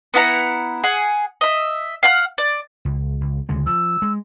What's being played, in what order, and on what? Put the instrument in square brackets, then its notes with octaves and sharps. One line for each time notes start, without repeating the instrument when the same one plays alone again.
[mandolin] B3 E4 F#5 A#5
G#4 F#5
D#5 E5
F5 F#5 F6
D5
[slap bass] C#2
C#2
D2 C#3 G#3
[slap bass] F3 [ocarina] E6
[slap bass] G#3